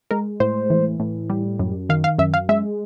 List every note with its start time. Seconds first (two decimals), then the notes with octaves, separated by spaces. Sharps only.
0.11 G#3 A#4
0.40 A2 C5
0.70 E3
1.00 A2
1.30 G3
1.59 F#2
1.89 D#3 F5
2.04 F5
2.18 F#2 E5
2.34 F5
2.49 G#3 E5